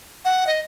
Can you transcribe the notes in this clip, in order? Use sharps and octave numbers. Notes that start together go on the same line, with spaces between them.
F#5
D#5